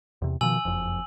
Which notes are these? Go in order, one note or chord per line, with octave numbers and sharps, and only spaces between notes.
E2 C3
B2 D#3 F3 G#5 E6 F#7
F#1 F2